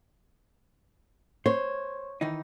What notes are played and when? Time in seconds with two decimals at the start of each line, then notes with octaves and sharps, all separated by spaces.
1.46 C5 C#5
2.21 D#3 E3 D#4